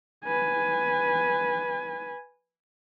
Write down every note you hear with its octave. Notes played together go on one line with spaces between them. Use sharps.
B4 G#5